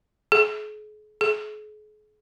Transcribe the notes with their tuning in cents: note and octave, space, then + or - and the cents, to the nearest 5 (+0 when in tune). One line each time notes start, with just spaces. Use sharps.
G#4 +40
G#4 +40